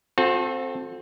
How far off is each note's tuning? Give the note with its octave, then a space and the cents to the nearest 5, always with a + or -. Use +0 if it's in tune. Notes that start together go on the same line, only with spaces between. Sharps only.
C4 +0 F#4 -45 A4 +0